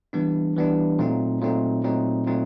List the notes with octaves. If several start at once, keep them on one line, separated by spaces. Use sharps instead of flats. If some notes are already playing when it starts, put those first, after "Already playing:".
E3 G3 B3 D4
E3 G3 B3 D4
A#2 F#3 A3 C4 D#4
A#2 F#3 A3 C4 D#4
A#2 F#3 A3 C4 D#4
A#2 F#3 A3 C4 D#4